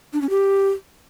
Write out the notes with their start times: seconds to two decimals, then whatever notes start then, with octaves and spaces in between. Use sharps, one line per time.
0.13 D4
0.22 C#4
0.30 G4